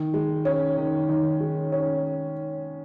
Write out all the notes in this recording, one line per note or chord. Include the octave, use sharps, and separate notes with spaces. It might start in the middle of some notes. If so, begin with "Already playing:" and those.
Already playing: D#3
G#3
C#4
D#3
D#3
G#3
C#4